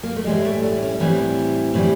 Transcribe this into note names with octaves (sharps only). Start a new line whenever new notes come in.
A#3
A3
A2 E3 G3 G#3
G#3
A3
D4
C#4
A2 E3 G3 C4
A2 E3 G3